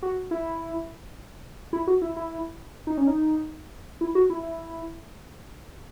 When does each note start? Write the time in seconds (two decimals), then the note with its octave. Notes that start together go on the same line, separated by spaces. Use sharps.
0.03 F#4
0.31 E4
1.73 E4
1.87 F#4
2.02 E4
2.16 E4
2.87 D#4
2.98 C#4
3.07 D#4
4.01 E4
4.15 F#4
4.30 E4
4.43 E4